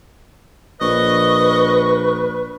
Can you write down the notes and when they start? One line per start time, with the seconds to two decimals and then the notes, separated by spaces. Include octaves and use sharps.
0.81 A#1 B4 D#5 C#6